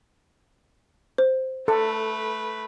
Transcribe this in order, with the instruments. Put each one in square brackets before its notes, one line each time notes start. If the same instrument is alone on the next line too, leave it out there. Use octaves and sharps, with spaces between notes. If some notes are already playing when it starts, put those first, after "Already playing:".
[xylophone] C5
[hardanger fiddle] A3 B4 [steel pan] A4